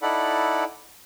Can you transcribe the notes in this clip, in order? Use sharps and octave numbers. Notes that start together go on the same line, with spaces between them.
D#4 E4 A4 D5 F#5 B5